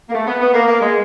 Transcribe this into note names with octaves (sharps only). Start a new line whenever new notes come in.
A#3
A3
B3
B3
A#3
A#3
G#3